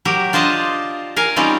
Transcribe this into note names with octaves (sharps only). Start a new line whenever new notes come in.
F#3 G4 A#4
D4 F4 C5 D#5 A5 A#5
A#4 F5 G#5
G3 C4 C#4 D#4 F4